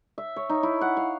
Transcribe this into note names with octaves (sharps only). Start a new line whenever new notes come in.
E5
C#5
D#4
E4
F#5
F5